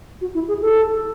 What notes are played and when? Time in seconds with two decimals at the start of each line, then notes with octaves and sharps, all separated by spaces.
0.21 F#4
0.34 E4
0.48 G#4
0.61 A4